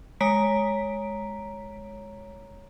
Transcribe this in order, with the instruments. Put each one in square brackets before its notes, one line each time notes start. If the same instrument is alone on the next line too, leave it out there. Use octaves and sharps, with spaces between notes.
[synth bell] G#3 C#5 A#5 B6 D7